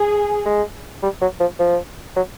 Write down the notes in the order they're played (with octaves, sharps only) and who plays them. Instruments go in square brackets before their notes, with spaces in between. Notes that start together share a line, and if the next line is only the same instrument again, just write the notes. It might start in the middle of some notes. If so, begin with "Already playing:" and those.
Already playing: [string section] G#4
[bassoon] G#3
G3
F#3
F3
F3
F#3